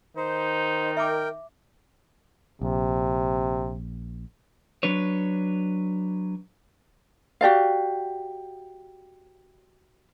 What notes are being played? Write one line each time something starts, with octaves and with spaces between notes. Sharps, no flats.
D#3 D#4 C5
A#4 E5 G5 D6
A#1 C3
F#3 D4 B4 C#5
F#4 G4 D5 F5